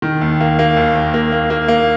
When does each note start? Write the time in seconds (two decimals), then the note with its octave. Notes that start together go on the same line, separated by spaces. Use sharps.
0.02 D#3
0.21 D#2
0.40 A#3
0.59 A#3
0.77 D#2
0.95 D#2
1.14 A#3
1.32 A#3
1.50 A#3
1.68 A#3